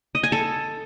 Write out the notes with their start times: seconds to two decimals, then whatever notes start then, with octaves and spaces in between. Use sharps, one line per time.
0.15 D#5
0.23 G#5
0.32 A4